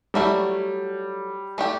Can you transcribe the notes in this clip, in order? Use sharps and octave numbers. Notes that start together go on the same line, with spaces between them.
F#3 G3 A3 E4
A3 D4 G4 D5